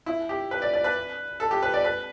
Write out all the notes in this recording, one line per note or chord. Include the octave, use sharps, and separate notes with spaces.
E4
G4
B4
D5
D5
B4
A4
G4
B4
D5
B4